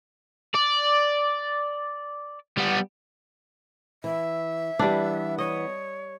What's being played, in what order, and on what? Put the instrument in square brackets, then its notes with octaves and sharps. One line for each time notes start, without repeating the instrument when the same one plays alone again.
[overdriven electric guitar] D5
G3 B3
[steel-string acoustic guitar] E3 [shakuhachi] E5
[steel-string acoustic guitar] E3 B3 [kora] G3 D4
[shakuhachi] C#5 [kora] D#5